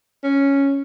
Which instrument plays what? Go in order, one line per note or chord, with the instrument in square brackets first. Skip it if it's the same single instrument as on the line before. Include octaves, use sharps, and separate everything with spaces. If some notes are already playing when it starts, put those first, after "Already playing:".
[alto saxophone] C#4